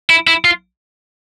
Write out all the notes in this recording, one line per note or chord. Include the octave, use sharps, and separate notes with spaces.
E4
E4
F4